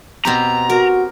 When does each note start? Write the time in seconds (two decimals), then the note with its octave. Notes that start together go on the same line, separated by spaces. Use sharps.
0.25 B2 C4 G4 A#5
0.70 F#4 A#4